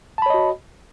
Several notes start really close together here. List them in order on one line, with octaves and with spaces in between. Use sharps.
A5 B5 C#5 D#5 F#4